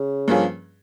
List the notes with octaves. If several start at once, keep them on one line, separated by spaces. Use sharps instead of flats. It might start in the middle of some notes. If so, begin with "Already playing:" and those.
Already playing: C#3
G2 F3 A#3 C#4 G#4